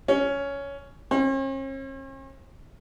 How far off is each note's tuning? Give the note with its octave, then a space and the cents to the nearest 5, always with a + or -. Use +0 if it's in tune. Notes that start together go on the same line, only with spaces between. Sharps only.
C#4 +10
C#4 -45